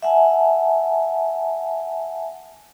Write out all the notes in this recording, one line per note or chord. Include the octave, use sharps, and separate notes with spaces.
E5 F#5 G#5 A5